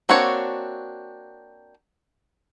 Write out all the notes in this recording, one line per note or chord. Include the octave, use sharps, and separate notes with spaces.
A#3 C4 D4 F#4 C#5